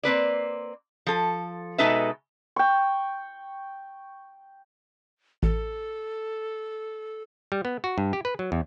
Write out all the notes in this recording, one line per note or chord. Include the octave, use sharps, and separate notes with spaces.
A#3 C4 B4 D5
F3 A4
B2 G#3 D#4 A4 B4 E5
G5 C#6
A1 A4
G3
B3
F#4
G2
G4
B4
F#3
E2